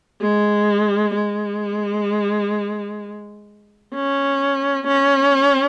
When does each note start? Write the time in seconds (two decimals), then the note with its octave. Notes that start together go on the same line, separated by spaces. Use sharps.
0.21 G#3
1.14 G#3
3.94 C#4
4.87 C#4